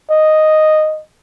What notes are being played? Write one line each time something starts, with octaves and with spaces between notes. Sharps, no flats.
D#5